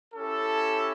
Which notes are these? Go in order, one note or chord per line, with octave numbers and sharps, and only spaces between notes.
C#4 E4 G4 A4